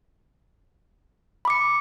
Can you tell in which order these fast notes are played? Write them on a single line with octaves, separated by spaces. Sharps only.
B5 D6 C#7